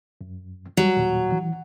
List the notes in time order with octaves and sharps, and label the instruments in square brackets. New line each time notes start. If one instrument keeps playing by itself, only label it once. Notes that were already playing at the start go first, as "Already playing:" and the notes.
[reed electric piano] F#2
[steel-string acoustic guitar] F#3 [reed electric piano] G3
[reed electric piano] D#2 A#2
E3